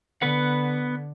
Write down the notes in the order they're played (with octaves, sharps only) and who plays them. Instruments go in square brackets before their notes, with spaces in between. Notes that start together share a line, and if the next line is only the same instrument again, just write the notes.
[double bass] D3 [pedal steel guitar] B3 B4 F#5